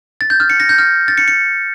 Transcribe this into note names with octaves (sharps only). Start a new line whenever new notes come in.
A6
G6
F6
C#7
A#6
G6
F6
A6
C#7
C#7